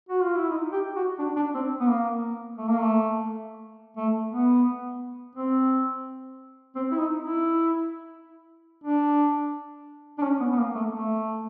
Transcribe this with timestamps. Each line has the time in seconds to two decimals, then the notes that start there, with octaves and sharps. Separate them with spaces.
0.09 F#4
0.22 F4
0.36 E4
0.50 D#4
0.72 G4
0.96 F#4
1.19 D4
1.36 D4
1.55 C4
1.80 B3
1.88 A#3
2.58 A3
2.68 A#3
2.80 A3
3.97 A3
4.32 B3
5.36 C4
6.75 C4
6.92 E4
6.99 D#4
7.22 E4
8.84 D4
10.18 D4
10.23 C#4
10.40 B3
10.53 B3
10.58 A#3
10.75 A3
10.92 A3